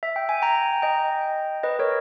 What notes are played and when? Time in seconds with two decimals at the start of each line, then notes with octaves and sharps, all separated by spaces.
0.03 E5
0.16 G5
0.29 G#5
0.42 G5 A#5
0.82 D#5 G5
1.63 B4 D#5
1.79 A#4 C#5